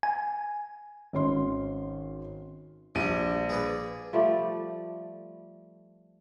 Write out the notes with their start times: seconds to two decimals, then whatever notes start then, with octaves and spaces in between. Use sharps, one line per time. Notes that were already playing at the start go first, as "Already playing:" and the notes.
0.03 G#5
1.13 G#1 C#4 C6
2.95 A#1 G3 D4 D#7
3.49 G#4 B4 D5
4.13 F3 G3 A3 D5